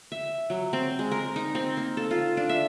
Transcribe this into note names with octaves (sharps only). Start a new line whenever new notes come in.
E5
F#3
C4
G#3
A#4
D#4
C4
A#3
A4
F4
D4
E5